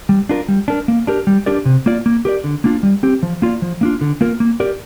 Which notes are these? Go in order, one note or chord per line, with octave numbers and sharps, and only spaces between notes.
G3
D4 F4 A#4
G3
D4 A#4
A#3
D4 G4 A#4
G3
D4 G4 A#4 D5
C3
A#3 F4 D5
A#3
G4 A#4 D5
D3
A#3 D4 F4
G3
C4 G4
F3
A#3 F4 D5
F3
A#3 D4 F4
D3
A#3 F4 A#4
A#3
G4 A#4 D5